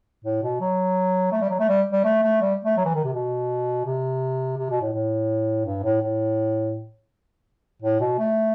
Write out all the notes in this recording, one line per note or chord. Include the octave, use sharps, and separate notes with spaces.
A2
B2
F#3
A3
G3
F#3
A3
G3
G3
A3
A3
G3
A3
F#3
E3
D#3
C3
B2
C3
C3
B2
A2
A2
G2
A2
A2
A2
B2
A3